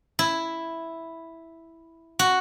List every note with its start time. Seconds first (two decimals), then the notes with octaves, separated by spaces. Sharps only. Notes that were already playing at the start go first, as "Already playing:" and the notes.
0.19 E4
2.19 F#4